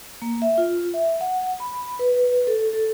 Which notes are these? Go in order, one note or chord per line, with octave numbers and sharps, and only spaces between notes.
A#3
E5
F4
E5
F#5
B5
B4
A4
A4